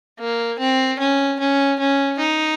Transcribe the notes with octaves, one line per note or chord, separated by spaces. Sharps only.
A#3
C4
C#4
C#4
C#4
D#4